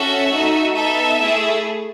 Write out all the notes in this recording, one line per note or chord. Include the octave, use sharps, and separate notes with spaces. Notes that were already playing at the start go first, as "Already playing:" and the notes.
Already playing: C#4 F#4 A4 E5
A3 D#4 F#4
B3 D#4 A4 E5
A3 E4 G#4